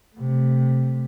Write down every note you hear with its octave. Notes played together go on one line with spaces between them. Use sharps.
C3 A3